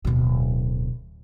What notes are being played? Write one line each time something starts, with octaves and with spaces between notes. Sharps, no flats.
D1 B2